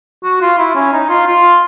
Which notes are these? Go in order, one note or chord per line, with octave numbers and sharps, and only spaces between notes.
F#4
F4
E4
C#4
D#4
F4
F4